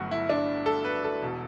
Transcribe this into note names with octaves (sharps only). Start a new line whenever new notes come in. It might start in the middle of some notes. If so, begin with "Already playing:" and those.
Already playing: G1 G2 F#3 A3 F#4
E4
D4
A4
B4
A4
E1 B2